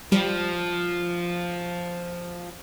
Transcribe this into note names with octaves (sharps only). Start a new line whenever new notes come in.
F3 G3